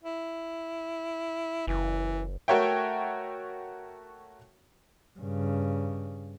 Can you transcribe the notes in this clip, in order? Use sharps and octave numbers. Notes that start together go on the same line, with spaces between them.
E4
F#1 E3
A3 F#4 A#4 C#5 E5 G5
G2 C#3